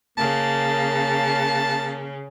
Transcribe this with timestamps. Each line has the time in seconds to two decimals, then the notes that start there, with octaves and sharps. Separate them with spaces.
0.18 C#3 A#3 A5